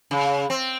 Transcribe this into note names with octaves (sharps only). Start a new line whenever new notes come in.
C#3
C4